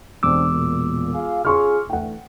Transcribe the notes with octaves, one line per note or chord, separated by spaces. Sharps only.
E1 G3 C4 D4 D6 E6
A#2
F4 G#4 F5
C#4 F4 G#4 C6 C#6 F6
D3 E3 A3 F#5 G5